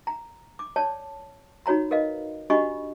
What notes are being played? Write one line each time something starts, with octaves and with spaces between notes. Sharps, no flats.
A#5
D6
C#5 D5 A5
D#4 F#4 C#5 A#5 B5
A#4 B4 D#5 F5
D4 F#4 G4 D#5 B5 C#6